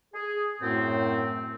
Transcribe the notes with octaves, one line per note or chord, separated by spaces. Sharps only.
G#4
F#2 A2 A3 C4